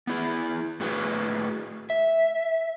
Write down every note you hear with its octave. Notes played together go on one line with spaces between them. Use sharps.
B3 E4 G#4
A2 F#4 G#4 B4
E5